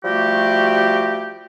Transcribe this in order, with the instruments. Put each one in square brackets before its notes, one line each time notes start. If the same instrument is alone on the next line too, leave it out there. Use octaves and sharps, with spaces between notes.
[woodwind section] F3 G3 A3 F#4 G4